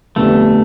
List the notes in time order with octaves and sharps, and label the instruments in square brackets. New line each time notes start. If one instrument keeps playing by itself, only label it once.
[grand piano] F2 D3 G3 B3 D4 [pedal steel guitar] A3